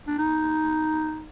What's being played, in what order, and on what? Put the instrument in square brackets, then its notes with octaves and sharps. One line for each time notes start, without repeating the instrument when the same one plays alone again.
[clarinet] D4
D#4